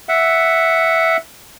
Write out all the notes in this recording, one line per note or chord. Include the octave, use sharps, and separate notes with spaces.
E5 F#5